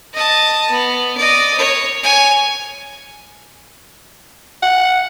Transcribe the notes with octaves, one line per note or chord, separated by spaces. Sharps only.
D#5 A5
B3
D5 D#5
C#5
C#5 G#5
F#5